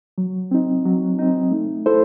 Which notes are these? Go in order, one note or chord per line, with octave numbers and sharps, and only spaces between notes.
F#3
C4 D#4
F#3
C4 D#4
A3
E4 A4 C5